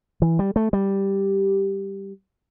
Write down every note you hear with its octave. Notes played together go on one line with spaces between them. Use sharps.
E3
G3
A3
G3